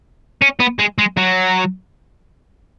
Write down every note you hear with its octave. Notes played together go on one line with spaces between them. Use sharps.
C#4
B3
G#3
G#3
F#3